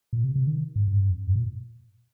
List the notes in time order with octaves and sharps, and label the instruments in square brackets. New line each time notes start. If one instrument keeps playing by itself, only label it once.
[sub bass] A#2
C3
C3
D#3
G#2
G#2
G2
F2
G2
A#2